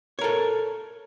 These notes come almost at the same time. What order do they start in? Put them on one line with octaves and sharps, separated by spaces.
C#5 A#4 A4